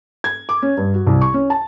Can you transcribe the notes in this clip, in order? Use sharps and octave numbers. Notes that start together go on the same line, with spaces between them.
G#6
D6
C#4
G2
F#4
C2
C#6
C#4
A5